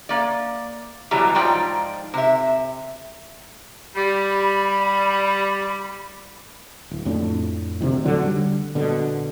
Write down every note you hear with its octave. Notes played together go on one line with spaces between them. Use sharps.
A#3 D5
B2 E3 F#3 G3 G4 A#5
G#2 F3 D#4 F4 D5 G5
C3 E5
G3 B5
D1
F2 A2 D4
D2 C3 D#3 E3
D#1 D3 F#3 D4
D3 G3
A#1 B2 D3